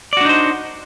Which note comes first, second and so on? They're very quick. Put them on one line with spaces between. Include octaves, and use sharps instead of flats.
D5 F#4 D4 D#4 C5